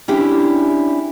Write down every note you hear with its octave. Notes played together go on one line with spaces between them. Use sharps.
C#4 D4 E4 G4